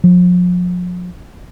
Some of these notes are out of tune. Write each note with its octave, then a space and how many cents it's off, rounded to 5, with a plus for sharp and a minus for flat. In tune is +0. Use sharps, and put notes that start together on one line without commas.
F3 +40